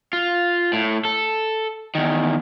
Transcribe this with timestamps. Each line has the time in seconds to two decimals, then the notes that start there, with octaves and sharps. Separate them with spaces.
0.13 F4
0.73 A2
1.05 A4
1.95 E2 D#3